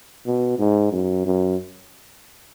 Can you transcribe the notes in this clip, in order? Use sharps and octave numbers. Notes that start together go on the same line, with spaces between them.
B2
G#2
F#2
F#2